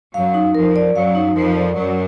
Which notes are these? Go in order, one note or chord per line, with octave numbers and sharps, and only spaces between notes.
F#2 F#3 F5
D#4
F2 F3 A#4
D5
F#2 F#3 F5
D#4
F2 F3 A#4
D5
F#2 F#3 A#4